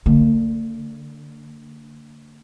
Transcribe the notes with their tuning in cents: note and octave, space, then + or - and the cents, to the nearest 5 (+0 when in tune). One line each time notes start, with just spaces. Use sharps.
D3 +0 A#3 -45